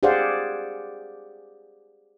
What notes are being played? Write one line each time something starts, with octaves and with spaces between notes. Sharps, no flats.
G4 G#4 C5 D5 F5 F#5